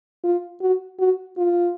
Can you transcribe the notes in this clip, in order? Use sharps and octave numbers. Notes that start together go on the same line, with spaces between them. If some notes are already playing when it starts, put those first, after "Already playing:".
F4
F#4
F#4
F4